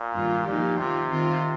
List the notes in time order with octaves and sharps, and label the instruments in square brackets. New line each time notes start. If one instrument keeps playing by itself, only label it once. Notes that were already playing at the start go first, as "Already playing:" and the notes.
Already playing: [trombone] A#2
[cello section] G2 D#3 A#3 F4
[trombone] A#2 [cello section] F3 A#3 D#4 G4
[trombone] C3 [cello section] D#3 A#3 F4
[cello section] D#3 C4 F4